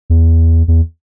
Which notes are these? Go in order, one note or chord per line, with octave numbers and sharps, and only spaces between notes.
E2
E2